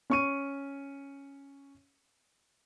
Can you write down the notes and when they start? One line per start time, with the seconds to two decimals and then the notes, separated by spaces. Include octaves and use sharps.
0.10 C#4 C#6 D#7